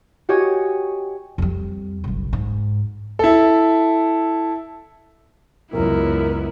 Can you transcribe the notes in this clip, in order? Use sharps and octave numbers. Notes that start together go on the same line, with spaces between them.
F#4 G4 C#5 D#5 G5 G#5
F2 G3
F#1 B1
G#2
E4 A4
C#2 F#2 B3 E4 A#4